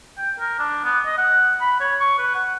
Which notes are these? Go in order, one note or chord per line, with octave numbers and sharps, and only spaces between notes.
G5
A#4
D4
B3
D#5
F#5
B5
C#5
C#6
B4
F#5